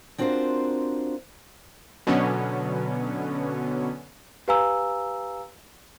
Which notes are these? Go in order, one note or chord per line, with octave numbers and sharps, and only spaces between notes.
C4 D4 F4 F#4 A#4 C5
B2 D3 F#3 B3 C#4
G4 B4 F5 G#5 A#5 E6